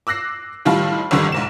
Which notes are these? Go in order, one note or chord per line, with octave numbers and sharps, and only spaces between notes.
D6 E6 F#6 A#6 C7
A2 D#3 G3 F4 A5
G#1 F2 D3 D#3 G3
B1 G#2 E7